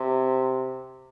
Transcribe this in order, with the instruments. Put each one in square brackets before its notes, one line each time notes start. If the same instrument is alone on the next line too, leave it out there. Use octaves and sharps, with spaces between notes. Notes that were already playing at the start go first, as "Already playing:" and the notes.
Already playing: [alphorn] C3